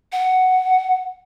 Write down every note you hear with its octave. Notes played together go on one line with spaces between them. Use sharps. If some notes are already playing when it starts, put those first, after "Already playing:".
F#5